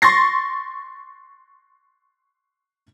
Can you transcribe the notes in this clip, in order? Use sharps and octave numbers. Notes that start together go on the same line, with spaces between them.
C6 C#6 A6 A#6 C7